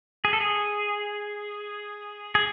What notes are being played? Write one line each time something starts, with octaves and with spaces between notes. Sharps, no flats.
G#4
A4
G#4
G#4